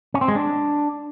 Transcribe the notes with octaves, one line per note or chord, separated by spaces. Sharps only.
C#4
C4
G#3
D4